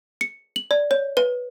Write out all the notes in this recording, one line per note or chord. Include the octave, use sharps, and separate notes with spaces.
C#7
F#7
D5
C#5
B4